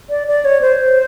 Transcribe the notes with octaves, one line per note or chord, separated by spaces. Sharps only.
D5
D5
C#5
C5